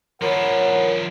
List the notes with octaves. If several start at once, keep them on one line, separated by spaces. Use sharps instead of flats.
F3 E4 A#4 C#5 F#5